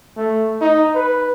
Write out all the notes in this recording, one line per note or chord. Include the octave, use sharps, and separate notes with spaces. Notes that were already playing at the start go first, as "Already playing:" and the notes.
A3
D#4
B4